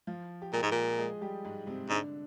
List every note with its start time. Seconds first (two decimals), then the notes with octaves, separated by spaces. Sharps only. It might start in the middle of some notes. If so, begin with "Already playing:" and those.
0.07 F3 F4
0.42 G4
0.53 A#2 G#3 G#4
0.62 G#2
0.71 A#2
0.98 G#3 G#4
1.21 G3 G4
1.45 G#2 G#3
1.67 C3 C4
1.89 G#2 D3 D4